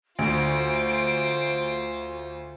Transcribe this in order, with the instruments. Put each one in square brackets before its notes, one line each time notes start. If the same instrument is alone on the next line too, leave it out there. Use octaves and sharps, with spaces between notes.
[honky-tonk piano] D2 [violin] F4 C5 [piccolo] D7